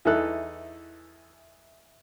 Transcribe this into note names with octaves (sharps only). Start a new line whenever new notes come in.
E2 E3 D#4 A4 F#6